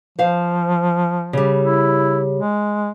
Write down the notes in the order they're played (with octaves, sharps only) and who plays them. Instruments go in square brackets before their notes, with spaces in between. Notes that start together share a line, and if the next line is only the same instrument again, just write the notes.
[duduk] F3 [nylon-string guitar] C5 F5
[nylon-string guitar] C#3 G3
[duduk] E4
G#3